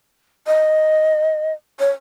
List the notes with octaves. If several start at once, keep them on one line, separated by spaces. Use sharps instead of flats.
D#5
C#5